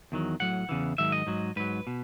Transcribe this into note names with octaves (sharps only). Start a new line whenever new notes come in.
E2 D#3 F#3
A2 F#3 F#5
E2 C#3 E3
G#2 D#3 F#3 E5
D#5
G#2 F#3
G#2 F#3 B4
B2